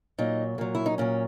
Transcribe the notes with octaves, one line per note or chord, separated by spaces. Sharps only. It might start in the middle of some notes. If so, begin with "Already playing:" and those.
A#2 F#3 D#4
A#2 F#3
E4
D#4
A#2 F#3 C#4